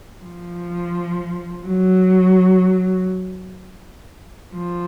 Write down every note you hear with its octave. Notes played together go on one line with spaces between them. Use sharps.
F3
F#3
F3